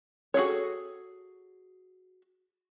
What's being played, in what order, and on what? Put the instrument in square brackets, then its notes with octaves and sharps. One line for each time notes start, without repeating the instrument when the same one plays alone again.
[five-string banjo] F#4 G#4 A4 C#5